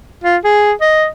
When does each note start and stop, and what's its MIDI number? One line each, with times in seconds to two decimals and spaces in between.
0.24 0.37 65
0.44 0.73 68
0.81 1.07 75